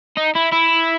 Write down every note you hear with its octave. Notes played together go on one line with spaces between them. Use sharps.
D#4
E4
E4